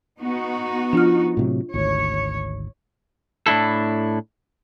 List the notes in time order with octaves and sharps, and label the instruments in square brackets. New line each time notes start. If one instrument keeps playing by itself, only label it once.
[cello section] B3 D#4 F#4
[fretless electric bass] F3 [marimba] D4 F4 F6
[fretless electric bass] A2 C3 F#3
[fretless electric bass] G#1 D2 [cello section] C#5
[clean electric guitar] A2 D4 E4 A4